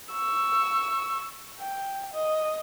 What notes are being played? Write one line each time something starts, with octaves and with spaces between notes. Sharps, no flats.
C#6 E6
G5
D#5